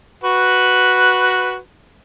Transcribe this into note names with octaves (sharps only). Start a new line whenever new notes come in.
F#4 B4